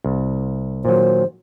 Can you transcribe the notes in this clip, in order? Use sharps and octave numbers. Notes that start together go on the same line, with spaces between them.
C2
A#2 D#3 F#3 C5